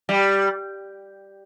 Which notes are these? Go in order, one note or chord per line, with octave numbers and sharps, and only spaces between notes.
G3